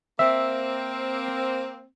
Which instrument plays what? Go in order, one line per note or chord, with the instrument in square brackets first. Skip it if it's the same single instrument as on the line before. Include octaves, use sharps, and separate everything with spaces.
[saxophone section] A#3 C4 [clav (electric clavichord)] E5